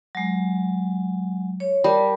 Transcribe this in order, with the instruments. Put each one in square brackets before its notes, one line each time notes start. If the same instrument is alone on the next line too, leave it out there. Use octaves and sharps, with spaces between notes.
[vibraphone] F#3 G#3
C#5
[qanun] G3 [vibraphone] A#4 A5